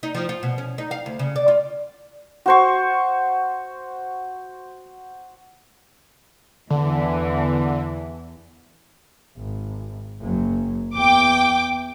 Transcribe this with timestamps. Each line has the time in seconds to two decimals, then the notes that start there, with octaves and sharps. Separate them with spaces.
0.03 D#4
0.15 F3
0.29 F4
0.43 B2
0.58 C#4
0.78 D#4
0.91 F5
1.06 D2
1.19 C#3
1.36 D5
1.48 F4
2.46 F#4 C5 C#6
6.70 E2 D3 E3
9.38 G#1
10.22 F#1 F#3
10.95 E2 G5 D6